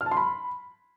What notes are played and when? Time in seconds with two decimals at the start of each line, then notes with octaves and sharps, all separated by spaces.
0.01 F6
0.06 A5
0.12 C6
0.17 B5